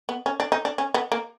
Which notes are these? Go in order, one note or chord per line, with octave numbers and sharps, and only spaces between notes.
B3
C#4
D4
D#4
D4
C#4
B3
A#3